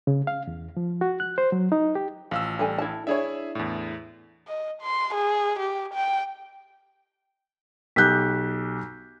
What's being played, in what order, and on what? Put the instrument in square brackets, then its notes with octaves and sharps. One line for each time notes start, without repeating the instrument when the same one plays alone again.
[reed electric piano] C#3
F5
E2
F3
F#4
F#6
C5
F#3
D#4
G4
[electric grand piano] A1 F5 E6 [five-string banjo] F3
[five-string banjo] G3 A4 G#5
E4 A5
[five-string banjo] D4 E4 C#5 [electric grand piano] G#4 E5
[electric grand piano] E2 A2
[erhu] D#5
C6
G#4
G4
G5
[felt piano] B1 G4 G6 [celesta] F#6 B6